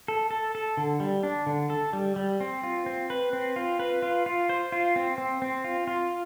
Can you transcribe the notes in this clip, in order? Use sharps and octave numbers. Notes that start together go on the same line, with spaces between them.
A4
A4
A4
D3
G3
D4
D3
A4
G3
G3
C4
F4
C4
B4
C4
F4
B4
F4
F4
C5
F4
C4
C4
C4
F4
F4